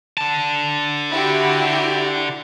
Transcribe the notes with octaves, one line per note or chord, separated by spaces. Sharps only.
D3 A5
E4 F#4 G4